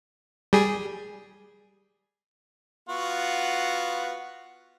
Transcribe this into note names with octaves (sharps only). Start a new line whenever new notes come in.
G3 G#4
B3 F4 F#4